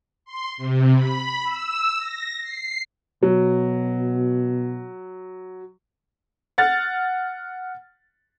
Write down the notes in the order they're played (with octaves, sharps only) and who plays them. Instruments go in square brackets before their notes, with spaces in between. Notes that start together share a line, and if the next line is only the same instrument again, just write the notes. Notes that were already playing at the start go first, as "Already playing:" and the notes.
[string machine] C6
C3
B5
E6
A#6
C7
[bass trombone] B2 [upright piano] F#3
[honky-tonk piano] F#5 F6 A6